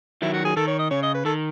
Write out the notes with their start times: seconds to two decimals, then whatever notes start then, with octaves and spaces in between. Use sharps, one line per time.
0.22 D#3 F#3 E4
0.34 F#4
0.45 G#4
0.56 D#3 A4
0.67 C#5
0.79 D#5
0.91 C#3 C#5
1.03 D#5
1.14 B4
1.25 D#3 A4